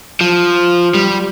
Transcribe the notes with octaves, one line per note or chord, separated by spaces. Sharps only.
F3
G3